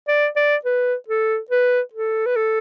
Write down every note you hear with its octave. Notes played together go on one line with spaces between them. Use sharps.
D5
D5
B4
A4
B4
A4
B4
A4